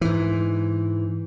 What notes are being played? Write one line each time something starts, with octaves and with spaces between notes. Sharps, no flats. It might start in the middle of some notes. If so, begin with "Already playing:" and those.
G#2 E3